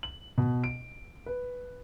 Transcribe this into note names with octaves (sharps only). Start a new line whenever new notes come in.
F#7
B2
D7
B4